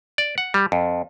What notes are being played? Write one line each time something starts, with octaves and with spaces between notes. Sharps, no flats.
D5
F#5
G3
F2